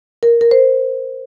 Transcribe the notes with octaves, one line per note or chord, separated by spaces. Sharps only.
A#4
A#4
C5